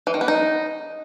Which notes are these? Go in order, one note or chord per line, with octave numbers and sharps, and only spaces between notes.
E3
D#3
B3
D#4